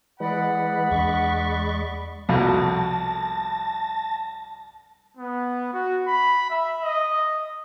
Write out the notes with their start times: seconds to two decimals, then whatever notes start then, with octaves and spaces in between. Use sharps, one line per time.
0.20 E3 G#3 D5 D#5 F#5 B5
0.91 E2 G#3 D4 C#6
2.29 C2 F2 B2 A5 A6 A#6
5.17 B3
5.73 F#4
6.07 B5
6.50 E5
6.83 D#5